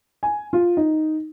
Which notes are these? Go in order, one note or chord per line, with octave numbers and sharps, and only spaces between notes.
G#5
F4
D#4